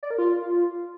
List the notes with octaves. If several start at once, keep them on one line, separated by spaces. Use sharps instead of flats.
D5
A#4
F4